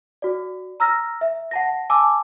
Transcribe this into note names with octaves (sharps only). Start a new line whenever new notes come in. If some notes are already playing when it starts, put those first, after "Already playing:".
F#4 D5
A#5 E6 F6 A#6
E5
F#5 A5 A#6
G#5 A5 D6 E6